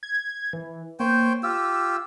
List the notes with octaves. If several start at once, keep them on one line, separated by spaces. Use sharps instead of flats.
G#6
E3
A#3 C5 C#5 G5
F4 G4 E6